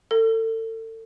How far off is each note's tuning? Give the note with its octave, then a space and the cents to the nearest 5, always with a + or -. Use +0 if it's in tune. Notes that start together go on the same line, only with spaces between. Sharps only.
A4 +35